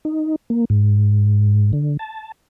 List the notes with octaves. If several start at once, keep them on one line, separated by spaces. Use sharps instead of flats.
D#4
A#3
G#2
D3
A5